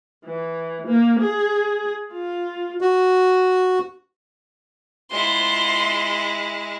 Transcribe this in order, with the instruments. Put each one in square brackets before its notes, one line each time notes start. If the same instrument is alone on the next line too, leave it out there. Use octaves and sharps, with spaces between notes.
[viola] E3
A#3
G#4
F4
[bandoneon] F#4
[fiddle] G#3 E4 [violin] F4 C6